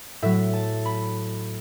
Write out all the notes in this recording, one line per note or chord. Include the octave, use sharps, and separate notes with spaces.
A2 F#3 E5
A5
B5